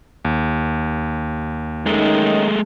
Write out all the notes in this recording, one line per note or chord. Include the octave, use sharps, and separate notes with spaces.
D#2
D#3 G#3 A3 C#4 D#4